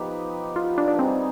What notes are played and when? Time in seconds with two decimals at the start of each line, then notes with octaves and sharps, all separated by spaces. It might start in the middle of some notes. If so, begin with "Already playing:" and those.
Already playing: F3 B3 D#4 G4 B4
0.56 F4
0.78 D4
0.88 D4
0.98 G3 B3 C4 D#4 G#4